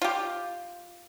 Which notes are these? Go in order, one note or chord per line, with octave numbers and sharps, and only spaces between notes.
F4 G4